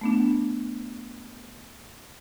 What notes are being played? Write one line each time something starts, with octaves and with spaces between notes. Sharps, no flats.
A3 B3 D4